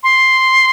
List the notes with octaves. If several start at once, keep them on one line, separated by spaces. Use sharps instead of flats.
C6